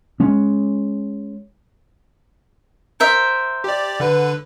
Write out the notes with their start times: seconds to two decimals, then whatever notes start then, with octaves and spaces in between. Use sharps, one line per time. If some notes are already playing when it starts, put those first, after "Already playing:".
0.20 G#3 C#4
3.00 A#4 C5 E5
3.64 G4 D5
4.00 D3 B4